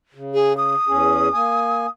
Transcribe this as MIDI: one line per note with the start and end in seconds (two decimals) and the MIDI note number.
0.15 0.75 49
0.34 0.56 68
0.57 1.90 87
0.88 1.29 40
0.88 1.29 61
0.88 1.29 68
1.34 1.86 58
1.34 1.86 80